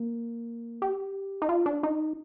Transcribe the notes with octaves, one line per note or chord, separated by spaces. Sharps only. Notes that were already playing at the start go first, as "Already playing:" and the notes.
Already playing: A#3
G4
D#4
F4
D4
D#4